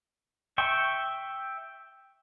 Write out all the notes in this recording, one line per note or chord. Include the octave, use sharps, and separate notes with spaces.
E5 G5 C#6